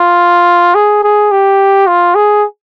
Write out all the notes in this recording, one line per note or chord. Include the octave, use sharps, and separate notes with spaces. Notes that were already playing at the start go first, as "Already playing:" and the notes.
Already playing: F4
G#4
G#4
G4
F4
G#4